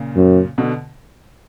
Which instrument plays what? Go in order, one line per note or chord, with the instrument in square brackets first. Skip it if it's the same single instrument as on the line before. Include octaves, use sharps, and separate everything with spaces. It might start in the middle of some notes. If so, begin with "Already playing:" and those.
Already playing: [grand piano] A#2 C#3
[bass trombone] F#2
[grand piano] B2 D3